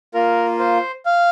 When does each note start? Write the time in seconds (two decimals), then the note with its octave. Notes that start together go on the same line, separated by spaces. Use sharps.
0.14 A#3 F4 A#4
0.59 C5
1.06 F5